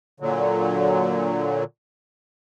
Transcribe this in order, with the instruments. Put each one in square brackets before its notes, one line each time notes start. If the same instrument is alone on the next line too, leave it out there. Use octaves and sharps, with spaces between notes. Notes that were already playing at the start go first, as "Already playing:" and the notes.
[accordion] A#2 D3 F#3